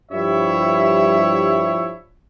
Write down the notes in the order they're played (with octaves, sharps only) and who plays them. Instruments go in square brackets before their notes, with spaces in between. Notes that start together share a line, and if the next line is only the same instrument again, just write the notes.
[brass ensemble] G2 F3 G3 E4 C#5 E5